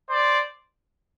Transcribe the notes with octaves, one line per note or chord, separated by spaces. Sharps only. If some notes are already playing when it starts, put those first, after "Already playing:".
C5 D5